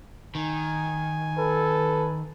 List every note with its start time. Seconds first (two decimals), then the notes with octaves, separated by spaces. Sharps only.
0.35 D#3 G#5
1.38 A4 B4